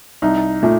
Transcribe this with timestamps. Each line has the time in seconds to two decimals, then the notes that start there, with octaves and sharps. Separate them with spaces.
0.22 C2 D#4
0.63 A#2 A3